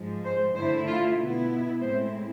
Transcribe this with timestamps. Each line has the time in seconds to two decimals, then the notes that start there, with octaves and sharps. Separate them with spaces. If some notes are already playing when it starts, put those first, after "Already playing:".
Already playing: G#2 F3 G#3
0.24 C5
0.55 D3 A3 E4 C5
0.86 F4
1.18 B2 B3 E4
1.81 A2 G#3 C4 E4 C5